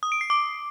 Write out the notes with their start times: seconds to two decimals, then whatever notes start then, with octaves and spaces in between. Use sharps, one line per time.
0.03 D#6
0.12 D7
0.21 C7
0.30 D6